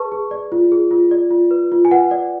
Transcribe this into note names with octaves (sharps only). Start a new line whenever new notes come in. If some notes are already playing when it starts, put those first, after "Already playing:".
Already playing: G#4 B4 A5 C#6
G#4
D5
F4
G#4
F4
D5
F4
B4
F4
G#5
B4 F#5
D5